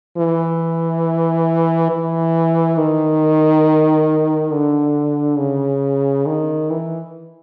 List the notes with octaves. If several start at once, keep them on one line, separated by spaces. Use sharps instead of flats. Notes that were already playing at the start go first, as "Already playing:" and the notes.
E3
E3
D#3
D3
C#3
D#3
E3